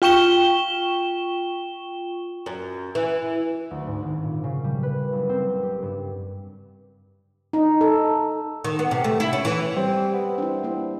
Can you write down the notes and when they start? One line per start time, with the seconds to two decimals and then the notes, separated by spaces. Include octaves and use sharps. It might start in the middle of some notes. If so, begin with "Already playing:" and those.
0.02 F4 G5 C#6 E7 G7
2.46 F#2
2.95 E3
3.71 D2
3.87 G#2
4.03 G#1
4.24 A#2
4.44 C#3
4.64 G3
4.83 B4
5.13 F#1
5.29 C4
5.63 G4
5.83 G2
7.53 D#4
7.81 A4
8.64 D#3
8.79 B3
8.91 C3
9.04 A3
9.20 E4
9.33 C#4
9.45 E3
9.76 G3 C4
10.13 B3
10.38 C4 D4 E4
10.63 A#3 C5